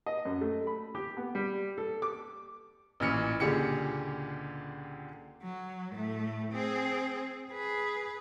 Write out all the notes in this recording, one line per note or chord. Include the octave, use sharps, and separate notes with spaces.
D#5
F#2
A3
B5
G4
B3
G3
A4
D6
A1 A#2 E3 F6 C#7
C#2 A#2 D3 G4 G#4 C#7
F#3
A2 A3
C4 G#4
G#4 B4